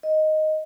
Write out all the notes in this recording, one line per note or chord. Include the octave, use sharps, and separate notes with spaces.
D#5